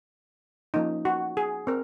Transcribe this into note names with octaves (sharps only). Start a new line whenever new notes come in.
F3 A#3 C#4 D#4
F#4
G#4
C4 A#4